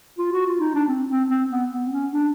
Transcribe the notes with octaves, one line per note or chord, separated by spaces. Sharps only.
F4
F#4
F4
D#4
D4
C4
C4
C4
B3
B3
C4
C#4
D4